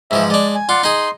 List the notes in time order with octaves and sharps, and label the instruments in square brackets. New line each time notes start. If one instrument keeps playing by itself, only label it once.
[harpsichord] G#2 E3 F3 [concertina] E5
[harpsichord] G#3 D4 [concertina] D5
[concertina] G#5
[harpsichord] F4 [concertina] D5 F#5 C6
[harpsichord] D#4 G#4 [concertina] C6